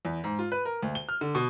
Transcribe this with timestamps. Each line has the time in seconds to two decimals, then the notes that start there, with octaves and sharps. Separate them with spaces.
0.05 E2
0.24 G#2
0.39 F4
0.52 B4
0.65 A#4
0.83 D2
0.95 G7
1.09 F6
1.21 D3
1.35 B2